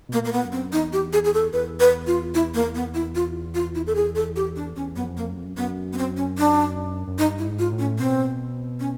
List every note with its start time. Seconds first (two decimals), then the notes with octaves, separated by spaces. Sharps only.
0.09 B2 A#3
0.18 A#2
0.25 A#3
0.32 B3
0.45 F#2
0.52 C4
0.73 E2 D#4
0.93 G4
1.13 G#4
1.25 G#4
1.34 A4
1.53 E2 B4
1.80 B4
2.07 F4
2.35 E4
2.54 A#3
2.75 B3
2.94 E4
3.15 F4
3.55 F4
3.75 E4
3.87 A4
3.95 G#4
4.16 A4
4.36 G4
4.56 D4
4.76 E2 C#4
4.96 F#2 B3
5.04 F2
5.17 A#3
5.30 F#2
5.37 F2
5.45 F#2
5.57 F#2 B3
5.93 B3
5.98 C4
6.17 C#4
6.38 D4
7.07 F#2
7.19 G2 D#4
7.39 E4
7.46 G#2
7.59 F4
7.72 A2
7.79 C#4
7.99 B2 C4
8.80 C#4